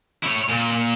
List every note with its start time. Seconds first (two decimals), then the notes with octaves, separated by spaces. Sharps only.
0.23 E4 C#5
0.48 A#2